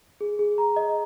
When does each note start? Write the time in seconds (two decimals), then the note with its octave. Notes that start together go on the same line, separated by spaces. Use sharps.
0.21 G#4
0.39 G#4
0.58 A#5
0.76 D#5